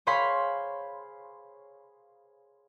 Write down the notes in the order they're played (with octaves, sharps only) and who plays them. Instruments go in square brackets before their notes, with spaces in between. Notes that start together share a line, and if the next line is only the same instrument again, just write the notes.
[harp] G#4 C5 C#5 F5 B5 C6